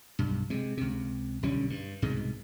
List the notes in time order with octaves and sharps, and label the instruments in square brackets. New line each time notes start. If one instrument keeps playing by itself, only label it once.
[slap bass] B1 G2
C3 G#3
C#2 C3
B1 D3 G3 C#4
G2
C2 G#2 B2 G#3